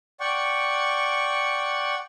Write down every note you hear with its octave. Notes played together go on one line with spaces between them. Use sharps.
D5 F#5 G5 C#6